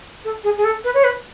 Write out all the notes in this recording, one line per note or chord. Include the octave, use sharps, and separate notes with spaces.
A4
G#4
G#4
A4
B4
C#5
B4